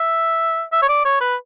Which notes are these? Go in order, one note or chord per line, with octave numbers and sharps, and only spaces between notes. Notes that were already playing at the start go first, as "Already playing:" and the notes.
Already playing: E5
E5
C#5
D5
C#5
B4